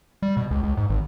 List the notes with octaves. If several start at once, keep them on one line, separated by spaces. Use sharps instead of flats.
G3
B2
C#2
C#2
G#2
G#1